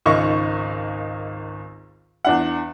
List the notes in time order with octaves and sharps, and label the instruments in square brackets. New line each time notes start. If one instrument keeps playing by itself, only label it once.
[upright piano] G#1 C#2 D#3 D#5 C#6
E2 D4 F#5